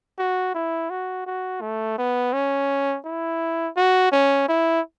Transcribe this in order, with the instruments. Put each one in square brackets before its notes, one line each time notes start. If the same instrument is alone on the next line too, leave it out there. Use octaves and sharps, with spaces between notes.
[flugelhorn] F#4
E4
F#4
F#4
A3
B3
C#4
E4
F#4
C#4
E4